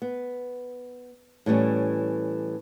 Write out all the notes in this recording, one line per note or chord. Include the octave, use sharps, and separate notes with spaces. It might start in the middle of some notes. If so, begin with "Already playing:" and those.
B3
A2 E3 G3 C#4